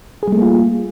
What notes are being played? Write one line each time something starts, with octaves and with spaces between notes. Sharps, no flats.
G3 A3 A#3 F4 G#4